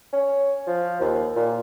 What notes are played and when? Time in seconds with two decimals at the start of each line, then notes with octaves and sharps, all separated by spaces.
0.13 C#4
0.67 F3
1.01 D#2
1.36 A#2